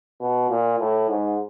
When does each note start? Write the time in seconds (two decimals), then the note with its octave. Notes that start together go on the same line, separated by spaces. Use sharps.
0.20 B2
0.50 A#2
0.79 A2
1.09 G#2